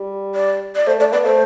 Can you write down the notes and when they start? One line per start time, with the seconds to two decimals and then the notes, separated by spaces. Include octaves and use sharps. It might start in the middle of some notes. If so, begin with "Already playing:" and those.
Already playing: G3
0.35 D5
0.76 D5
0.87 A3 C5
0.99 A3 D5
1.12 B3 D5
1.25 A3 C5